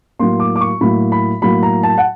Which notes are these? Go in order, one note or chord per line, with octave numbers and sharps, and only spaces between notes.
A2 F#3 A#3 C6
D6
D6
C#6
A2 F#3 A#3 B5
B5
A2 F#3 A#3 B5
A#5
A5
F#5